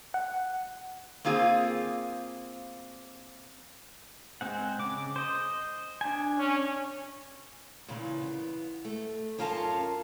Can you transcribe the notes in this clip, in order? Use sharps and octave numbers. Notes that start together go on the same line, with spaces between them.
F#5
A#3 C4 F4 G#4
G#3 C4 F#5
C#3 D6
C5 D#5
D4 G#5
C#4
A#2 C#3 E3
B3
A3
F#2 C#4 F4 A#4 F5 A5